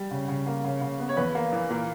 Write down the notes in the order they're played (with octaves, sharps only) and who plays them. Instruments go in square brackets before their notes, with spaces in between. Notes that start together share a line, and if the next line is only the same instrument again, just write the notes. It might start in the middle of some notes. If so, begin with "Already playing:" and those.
Already playing: [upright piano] G3
C#3
C#3
A#3
C#3
C#3
B3
C#5
E2 B4
A#3
E3
A#2 A#4